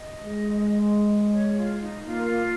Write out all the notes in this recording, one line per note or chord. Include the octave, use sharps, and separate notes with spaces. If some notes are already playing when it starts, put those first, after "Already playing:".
Already playing: D#5
G#3
C#5
F4
D#4
A#3 F4